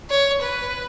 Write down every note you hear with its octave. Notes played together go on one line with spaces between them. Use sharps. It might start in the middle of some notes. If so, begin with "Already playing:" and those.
C#5
B4